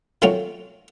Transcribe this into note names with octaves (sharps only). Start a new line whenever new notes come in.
D#3 F#3 A3 C4 C#4 F4